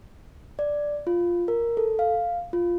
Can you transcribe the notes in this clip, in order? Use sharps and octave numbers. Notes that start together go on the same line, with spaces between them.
D5
F4
A#4
A4
F5
F4